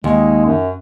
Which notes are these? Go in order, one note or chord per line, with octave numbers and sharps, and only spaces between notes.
D#2 G#3
F#2